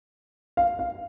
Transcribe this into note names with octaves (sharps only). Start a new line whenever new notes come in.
F5
F5